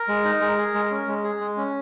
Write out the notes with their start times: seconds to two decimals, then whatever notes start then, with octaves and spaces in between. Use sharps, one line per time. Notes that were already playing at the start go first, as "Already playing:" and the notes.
Already playing: A#4
0.08 G#3
0.25 D#4
0.41 G#3
0.58 G#4
0.74 G#3
0.91 C#4
1.08 G#3
1.24 G#4
1.40 G#3
1.57 C#4